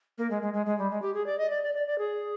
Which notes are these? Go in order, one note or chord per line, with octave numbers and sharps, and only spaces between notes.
A#3
G#3
G#3
G#3
G#3
G3
G#3
G4
G#4
D5
D#5
D5
D5
D5
D5
G#4